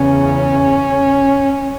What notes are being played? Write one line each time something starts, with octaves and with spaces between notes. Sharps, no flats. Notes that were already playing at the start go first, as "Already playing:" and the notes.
Already playing: E2 C#3 C#4